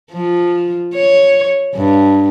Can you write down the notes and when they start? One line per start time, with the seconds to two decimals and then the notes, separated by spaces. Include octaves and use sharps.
0.12 F3
0.95 C#5
1.75 G2